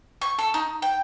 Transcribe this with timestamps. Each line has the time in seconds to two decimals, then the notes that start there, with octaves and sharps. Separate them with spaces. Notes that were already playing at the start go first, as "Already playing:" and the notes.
0.21 C#6
0.39 A4
0.54 D#4
0.82 G5